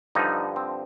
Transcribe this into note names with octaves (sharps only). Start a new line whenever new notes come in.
G2 D3 F3 D#4
C4